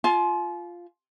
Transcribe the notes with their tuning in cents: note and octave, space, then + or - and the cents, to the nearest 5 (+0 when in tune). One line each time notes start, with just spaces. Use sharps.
F4 +0 G#5 +45